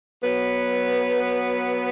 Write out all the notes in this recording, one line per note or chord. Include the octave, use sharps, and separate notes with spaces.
F#3 B3